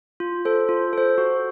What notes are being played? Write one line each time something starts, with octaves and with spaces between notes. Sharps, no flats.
F4
A4 C5
F4
A4 C5
F#4